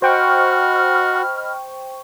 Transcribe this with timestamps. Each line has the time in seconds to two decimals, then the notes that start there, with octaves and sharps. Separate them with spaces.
0.02 F#4 C5 D#5 G5 B5 C#6 F6